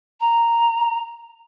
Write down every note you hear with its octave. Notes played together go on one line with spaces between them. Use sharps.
A#5